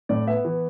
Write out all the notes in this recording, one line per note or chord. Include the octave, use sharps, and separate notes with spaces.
A2 D5
B3 E5
E3